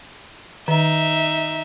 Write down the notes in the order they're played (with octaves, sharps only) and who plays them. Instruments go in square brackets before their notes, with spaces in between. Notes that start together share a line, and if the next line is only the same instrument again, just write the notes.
[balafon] D#3 A#5 [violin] D#4 E5